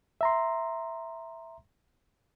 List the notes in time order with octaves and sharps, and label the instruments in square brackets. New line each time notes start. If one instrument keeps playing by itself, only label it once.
[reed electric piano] E5 A#5 C6